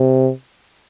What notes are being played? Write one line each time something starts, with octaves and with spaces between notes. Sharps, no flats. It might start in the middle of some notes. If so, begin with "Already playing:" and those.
Already playing: C3